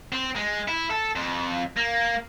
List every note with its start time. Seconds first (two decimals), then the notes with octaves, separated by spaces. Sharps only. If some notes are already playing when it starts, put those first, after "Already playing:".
0.12 C4
0.36 G#3
0.68 E4
0.90 A4
1.15 F2
1.77 A#3